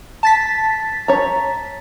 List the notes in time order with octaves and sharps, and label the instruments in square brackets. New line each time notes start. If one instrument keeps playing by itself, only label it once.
[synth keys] A5 A6 B6
[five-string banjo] C#5 A#5